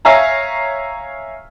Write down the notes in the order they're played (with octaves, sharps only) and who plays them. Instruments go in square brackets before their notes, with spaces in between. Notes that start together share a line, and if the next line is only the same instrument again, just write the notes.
[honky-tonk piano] C#5 E5 F5 G#5 A#5